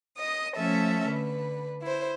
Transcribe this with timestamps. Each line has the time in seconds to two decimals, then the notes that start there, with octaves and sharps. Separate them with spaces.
0.18 D#5 D#6
0.56 F3 A3 C#4 A4 E5
1.07 D3 B4
1.83 E4 C5